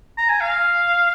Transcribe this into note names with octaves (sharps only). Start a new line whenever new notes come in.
A#5
G#5
F5